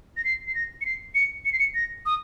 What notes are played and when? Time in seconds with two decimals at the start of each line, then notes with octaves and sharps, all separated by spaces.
0.17 A#6
0.25 C7
0.47 C7
0.55 A#6
0.81 C#7
0.86 C7
1.15 C#7
1.45 C#7
1.53 C7
1.59 C#7
1.75 A#6
2.06 D#6